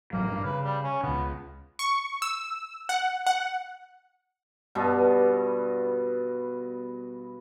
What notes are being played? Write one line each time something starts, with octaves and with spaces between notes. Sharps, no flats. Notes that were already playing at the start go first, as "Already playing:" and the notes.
A1 F#3 A#3
G2
C#3 B4
G3
C#4
C#2 C#3 B3
C#6
E6
F#5
F#5
G2 B2 B3